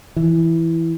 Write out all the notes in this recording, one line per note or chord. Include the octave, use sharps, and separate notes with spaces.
E3